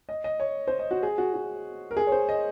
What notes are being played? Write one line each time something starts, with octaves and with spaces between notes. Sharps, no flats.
D#5
D#5
C#5
C5
D#5
F#4
G#4
F#4
F#4
A#4
G#4
C#5
C5
D#5